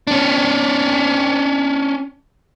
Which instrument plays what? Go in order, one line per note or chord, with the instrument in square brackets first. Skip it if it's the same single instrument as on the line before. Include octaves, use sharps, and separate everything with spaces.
[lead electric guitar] C#4 D4